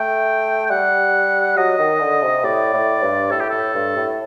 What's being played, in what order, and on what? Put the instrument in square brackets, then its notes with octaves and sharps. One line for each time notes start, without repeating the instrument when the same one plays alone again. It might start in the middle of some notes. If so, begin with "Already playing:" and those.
Already playing: [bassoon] A3 [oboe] G5
[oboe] G5
[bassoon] G3 [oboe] F#5
[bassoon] F#3 [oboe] D#5
[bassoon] D#3
D3
C3
[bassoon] A2 [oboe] D5
[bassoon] A2
G2
[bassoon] A2 [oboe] A4
[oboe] G4
[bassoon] A2 [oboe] A4
[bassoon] G2
A2